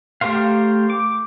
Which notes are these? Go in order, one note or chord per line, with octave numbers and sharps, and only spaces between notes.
A3 G4 A#4 C5 F5
D6